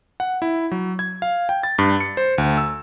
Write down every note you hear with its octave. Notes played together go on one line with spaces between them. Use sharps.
F#5
E4
F#3
G#6
F5
G5
A6
G2
C#7
C5
D2
E6